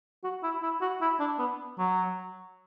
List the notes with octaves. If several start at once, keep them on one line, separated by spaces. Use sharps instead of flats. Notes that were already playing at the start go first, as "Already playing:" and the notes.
F#4
E4
E4
F#4
E4
D4
B3
F#3